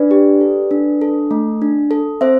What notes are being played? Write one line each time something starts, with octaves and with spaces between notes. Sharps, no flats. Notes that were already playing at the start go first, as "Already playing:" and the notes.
Already playing: D4 B4 D5
G4
A4
D4
A4
A3
D4
A4
C4 C5 E5